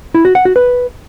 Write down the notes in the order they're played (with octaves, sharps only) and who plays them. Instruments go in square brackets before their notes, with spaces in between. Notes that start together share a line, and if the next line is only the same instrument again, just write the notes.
[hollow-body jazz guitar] E4
F#4
F#5
F#4
B4